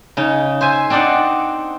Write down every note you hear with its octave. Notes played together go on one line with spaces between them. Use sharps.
C#3 D#4
C5 E5 G#5
C4 D4 D#4 D5 F#5